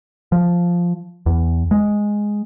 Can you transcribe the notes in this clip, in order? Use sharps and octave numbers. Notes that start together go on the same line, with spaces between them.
F3
E2
G#3